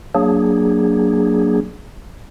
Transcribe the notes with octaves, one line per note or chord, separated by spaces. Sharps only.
F#3 A#3 D4 G#4